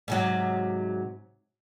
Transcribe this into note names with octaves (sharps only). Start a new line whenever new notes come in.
G#2 C3 F#3